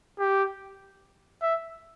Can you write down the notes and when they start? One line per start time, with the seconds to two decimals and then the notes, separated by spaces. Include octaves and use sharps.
0.19 G4
1.42 E5